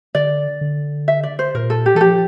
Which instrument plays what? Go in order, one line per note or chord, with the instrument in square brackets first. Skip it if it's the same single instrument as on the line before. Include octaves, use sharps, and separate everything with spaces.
[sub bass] D3 [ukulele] D5
[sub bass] D3
[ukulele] E5
D5
C5
[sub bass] A#2 [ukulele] A#4
[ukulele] A4
G4
[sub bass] E3 [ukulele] A4
[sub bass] F3 [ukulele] G4